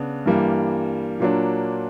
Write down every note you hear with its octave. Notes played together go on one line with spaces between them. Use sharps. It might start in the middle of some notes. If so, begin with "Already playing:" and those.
Already playing: C#3 B3 D4
G2 E3 G3 A#3
A#2 F#3 A#3 D4